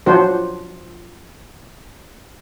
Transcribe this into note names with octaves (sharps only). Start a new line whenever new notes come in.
F3 F#3 D4 F#4 C5